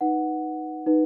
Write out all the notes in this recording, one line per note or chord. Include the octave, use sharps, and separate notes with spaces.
D#4 B4 F#5
D#4 B4